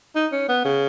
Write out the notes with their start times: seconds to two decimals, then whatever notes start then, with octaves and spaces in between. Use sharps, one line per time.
0.15 D#4
0.32 C#4
0.48 B3
0.65 C#3